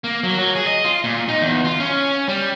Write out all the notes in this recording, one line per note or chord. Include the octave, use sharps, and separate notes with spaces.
A#3
F#3
F#3
G#4
D#5
F4
A#2
D#4
E2
F4
C#4
G3